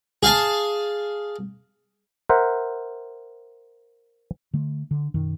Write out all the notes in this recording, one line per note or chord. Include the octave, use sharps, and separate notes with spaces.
G#4 F5 G#5 A5
A#4 C5 E5 F#5
D3 A3
D3
F#2 B2 D#3